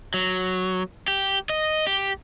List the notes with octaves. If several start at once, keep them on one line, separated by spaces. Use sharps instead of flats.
F#3
G4
D#5
G4